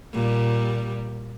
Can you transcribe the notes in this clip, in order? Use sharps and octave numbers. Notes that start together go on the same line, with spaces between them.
A#2 G3